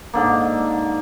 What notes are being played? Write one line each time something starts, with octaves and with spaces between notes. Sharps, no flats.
G#2 D3 A#3